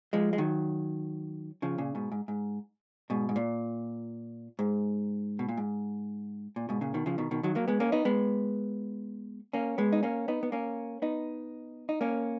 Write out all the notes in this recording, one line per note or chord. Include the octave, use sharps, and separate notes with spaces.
F3 G#3
G#3
D#3 F#3
C#3 F3
A#2 C#3
G#2 B2
G#2
G#2
G#2 B2
G#2
A#2
G#2
B2
A#2
G#2
A#2
G#2 B2
A#2 C#3
B2 D#3
C#3 F3
B2 D#3
B2 D#3
D#3 F#3
F#3 A#3
G#3 B3
A#3 C#4
B3 D#4
G#3 B3
A#3 C#4
G#3 B3
D#4
A#3 C#4
B3 D#4
B3
A#3 C#4
B3 D#4
D#4
A#3 C#4